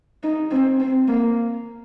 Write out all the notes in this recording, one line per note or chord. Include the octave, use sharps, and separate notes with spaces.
D#4
C4
C4
A#3